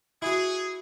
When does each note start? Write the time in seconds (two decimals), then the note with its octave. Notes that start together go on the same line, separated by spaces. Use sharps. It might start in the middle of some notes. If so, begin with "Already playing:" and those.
0.22 E4 F#4 G#4